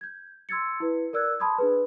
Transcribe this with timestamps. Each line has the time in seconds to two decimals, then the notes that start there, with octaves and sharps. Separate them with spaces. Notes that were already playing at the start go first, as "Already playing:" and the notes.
0.01 G6 G#6
0.49 C6 E6 G#6 A6 C#7
0.80 E4 B4
1.13 A#4 D5 E6 F#6 G#6
1.40 A5 B5 C6 D#6 G#6
1.58 D4 G#4 B4